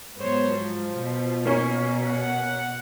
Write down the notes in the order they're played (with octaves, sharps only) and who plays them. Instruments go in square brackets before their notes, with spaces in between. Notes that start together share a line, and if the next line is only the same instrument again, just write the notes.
[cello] G#2 F#3 [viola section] B3 C5 C#5
[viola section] F3
[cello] B2
[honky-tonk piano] A#3 C#4 C#6
[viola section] F#5